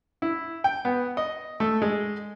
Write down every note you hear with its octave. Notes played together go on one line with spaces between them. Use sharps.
E4
G5
B3
D#5
A3
G#3